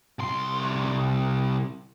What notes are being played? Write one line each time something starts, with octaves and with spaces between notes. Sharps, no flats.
C2 C6